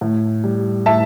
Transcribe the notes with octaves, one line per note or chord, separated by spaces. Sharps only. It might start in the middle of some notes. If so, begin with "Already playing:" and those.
A2
G3
A2 E5 A5